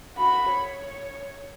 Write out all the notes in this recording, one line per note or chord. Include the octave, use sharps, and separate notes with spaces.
F#4 B5
C#5